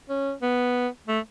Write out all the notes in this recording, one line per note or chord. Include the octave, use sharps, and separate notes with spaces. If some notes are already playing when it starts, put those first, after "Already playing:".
C#4
B3
A3